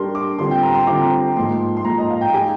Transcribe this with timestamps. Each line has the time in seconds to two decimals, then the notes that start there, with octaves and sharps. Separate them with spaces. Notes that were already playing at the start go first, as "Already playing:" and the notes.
Already playing: G3 D4 G4 A#4 C6
0.15 D6
0.39 D3 G3 C4 F4 C6
0.51 G5
0.63 A#5
0.75 C6
0.87 D3 G3 C4 F4 D6
1.36 G#2 F3 A#3 C6
1.77 C6
1.85 G#2 F3 A#3 A#5
1.98 D#5
2.10 F5
2.21 G5
2.33 G#3 D#4 G4 G#5